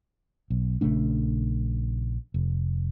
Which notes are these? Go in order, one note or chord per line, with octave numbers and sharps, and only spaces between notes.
B1
A#1 C#3 A3 D4
F1